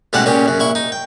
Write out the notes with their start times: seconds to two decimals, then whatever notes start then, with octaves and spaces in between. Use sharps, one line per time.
0.13 A1 B2 G3 G#3 D5 F#5
0.26 A#2 C#3 C#4 G4
0.46 F#2 C#3
0.60 A#1 E4 C#6
0.75 D#4
0.92 G5